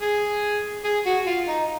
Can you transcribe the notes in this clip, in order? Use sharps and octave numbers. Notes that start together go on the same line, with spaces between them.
G#4
G#4
F#4
F4
D#4